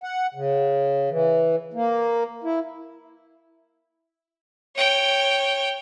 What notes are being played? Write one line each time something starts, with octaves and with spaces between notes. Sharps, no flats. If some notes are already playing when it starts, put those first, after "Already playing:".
F#5
C#3
E3
A#3
E4
C#5 G5